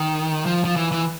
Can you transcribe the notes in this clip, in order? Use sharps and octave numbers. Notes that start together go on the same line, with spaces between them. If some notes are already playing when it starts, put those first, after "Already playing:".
Already playing: D#3
F3
F3
E3
E3